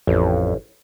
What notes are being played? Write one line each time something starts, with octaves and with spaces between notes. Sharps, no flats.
A1 F2